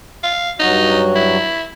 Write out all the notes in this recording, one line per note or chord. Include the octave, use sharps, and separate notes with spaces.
F5
G2 F#3 D#4 F#4
E4